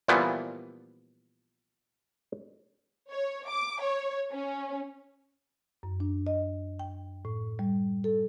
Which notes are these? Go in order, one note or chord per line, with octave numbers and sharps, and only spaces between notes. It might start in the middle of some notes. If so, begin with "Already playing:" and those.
A#2 E3 F3 G3 B3
C#5
D6
C#5
C#4
F#2
D4
D#5
G5
A2
G3
A4